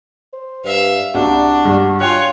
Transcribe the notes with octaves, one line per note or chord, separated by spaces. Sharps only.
C5
G2 E5 F5
C2 D4 F#4
G2
F4 C#5 G5 G#5 F#6